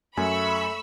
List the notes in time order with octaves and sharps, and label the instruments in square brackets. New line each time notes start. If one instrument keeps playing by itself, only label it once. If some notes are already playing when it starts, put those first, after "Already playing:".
[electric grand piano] F#2 G#5 [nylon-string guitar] A3 [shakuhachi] E5 [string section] B5 C#6 E6